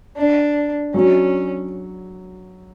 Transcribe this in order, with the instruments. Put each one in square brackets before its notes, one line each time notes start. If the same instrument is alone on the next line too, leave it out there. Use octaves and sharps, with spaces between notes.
[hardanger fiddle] D4
[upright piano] F#3 [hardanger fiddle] C#4